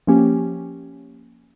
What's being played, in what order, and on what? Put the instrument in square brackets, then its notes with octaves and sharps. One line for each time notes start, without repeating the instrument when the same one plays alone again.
[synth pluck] F3 A#3 C#4 G4